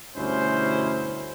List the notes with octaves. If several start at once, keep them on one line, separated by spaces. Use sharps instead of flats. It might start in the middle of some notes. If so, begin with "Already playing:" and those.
D2 G2 B2 C#4 E4 C5